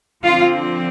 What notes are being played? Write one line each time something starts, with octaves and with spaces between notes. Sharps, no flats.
D3 F3 C4 F4